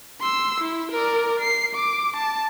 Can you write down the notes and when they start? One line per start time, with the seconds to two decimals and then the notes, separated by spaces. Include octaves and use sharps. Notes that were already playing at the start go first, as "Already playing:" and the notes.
0.21 C6 E6
0.60 E4
0.92 A#4 D5
1.40 C7
1.75 D6
2.16 A5